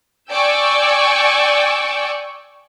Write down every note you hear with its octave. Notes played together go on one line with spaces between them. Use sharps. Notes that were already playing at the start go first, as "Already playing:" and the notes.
D5 G5 G#5 C#6 D6 E6